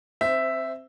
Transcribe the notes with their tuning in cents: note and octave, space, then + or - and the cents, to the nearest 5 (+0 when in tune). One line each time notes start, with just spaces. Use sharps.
C4 +10 C5 -15 E5 +0